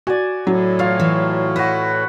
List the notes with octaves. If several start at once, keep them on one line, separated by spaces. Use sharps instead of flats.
F#4 D5 G#5
A2 F#3
E3 F4 C#5 F5
E3
E4 F#4 B4